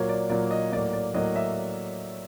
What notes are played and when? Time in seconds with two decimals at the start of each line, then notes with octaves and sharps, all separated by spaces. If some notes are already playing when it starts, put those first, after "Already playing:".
Already playing: A#2 F#3 A#3 C#5
0.09 D5
0.29 A#2 F#3 A#3 D5
0.51 D#5
0.72 A2 F#3 A#3 D5
0.93 D5
1.14 A2 F#3 A#3 D#5
1.36 E5